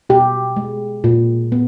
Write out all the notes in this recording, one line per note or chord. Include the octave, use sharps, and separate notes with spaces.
B2 G4
G#3
A#2
B3